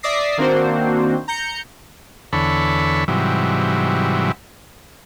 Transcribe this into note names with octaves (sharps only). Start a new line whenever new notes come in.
D5 E5 D6 D#6 A#6 C7
D#3 A#3 C4 D4 F#4 C5
A#5 G6 C#7
E2 D3 A4 C#5 B5
G#2 C3 E3 F#3 G3